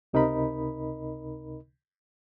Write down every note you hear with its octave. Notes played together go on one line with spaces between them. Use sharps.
C#2 C3 D#4 A#4 D#5 B5